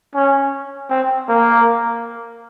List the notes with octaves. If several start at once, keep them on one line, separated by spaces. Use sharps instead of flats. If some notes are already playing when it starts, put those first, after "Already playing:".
C#4
C4
A#3